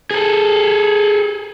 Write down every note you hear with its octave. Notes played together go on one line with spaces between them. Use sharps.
G#4 A4